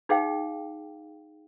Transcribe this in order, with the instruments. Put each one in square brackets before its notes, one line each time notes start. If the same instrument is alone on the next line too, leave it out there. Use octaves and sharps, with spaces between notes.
[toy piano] D#4 G#4 F5 G5